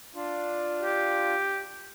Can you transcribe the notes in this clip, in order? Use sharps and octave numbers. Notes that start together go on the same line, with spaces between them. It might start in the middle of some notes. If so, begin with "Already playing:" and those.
D4 F4
G4